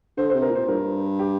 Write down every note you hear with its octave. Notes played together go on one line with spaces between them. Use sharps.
D3 C5
C5
C3
A#4
A#2 C5
G2 A#4
G4